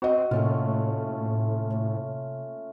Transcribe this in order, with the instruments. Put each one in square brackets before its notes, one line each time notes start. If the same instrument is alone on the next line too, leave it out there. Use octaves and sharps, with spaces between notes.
[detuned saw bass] C4 [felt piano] F#4 D#5
[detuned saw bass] A2 [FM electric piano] C3 A#3 [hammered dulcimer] A3 C#4 F4